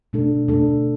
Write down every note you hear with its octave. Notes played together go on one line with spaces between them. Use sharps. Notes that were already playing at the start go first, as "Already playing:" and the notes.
B2 A3 D4 A4
B2 A3 D4 A4